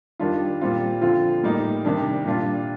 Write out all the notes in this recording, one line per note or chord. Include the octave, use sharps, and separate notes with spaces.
D#3 G3 D4 F4
A#2 G3 C4 F4
D3 F3 C4 F4
A2 G3 A#3 D#4
C3 D#3 G3 D4
A#2 G3 D4 F4